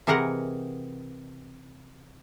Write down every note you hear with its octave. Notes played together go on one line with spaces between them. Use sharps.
C3 E3 G#4 A#4 D#5 F#5